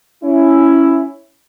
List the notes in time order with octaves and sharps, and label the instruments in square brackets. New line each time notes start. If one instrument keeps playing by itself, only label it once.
[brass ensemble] C#4 E4